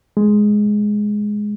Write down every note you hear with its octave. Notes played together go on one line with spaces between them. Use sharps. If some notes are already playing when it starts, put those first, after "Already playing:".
G#3